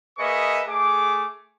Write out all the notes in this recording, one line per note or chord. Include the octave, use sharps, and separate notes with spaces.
A#3 G#4 B4 D#5 E5 C#6
A3 G#4 D6